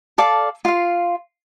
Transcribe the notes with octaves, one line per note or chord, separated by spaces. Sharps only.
A4 D5 F5 A5
F4 F5